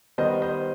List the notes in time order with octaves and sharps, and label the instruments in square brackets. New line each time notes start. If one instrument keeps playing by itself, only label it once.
[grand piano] D#3 G3 B3 C5 D#5
C5 D#5